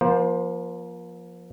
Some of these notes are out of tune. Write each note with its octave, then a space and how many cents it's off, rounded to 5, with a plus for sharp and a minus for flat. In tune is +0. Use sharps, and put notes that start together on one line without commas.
F3 +0 A#3 +35 C5 +0